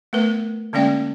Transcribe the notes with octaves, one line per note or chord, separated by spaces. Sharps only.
A3 B3 A#4 B4
D3 G#3 A#3 C#4 D5 G5